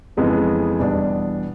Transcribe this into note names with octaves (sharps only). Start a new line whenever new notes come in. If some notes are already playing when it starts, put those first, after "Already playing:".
F2 C#3 E3 G#3 B3
E2 B2 G3 B3 D4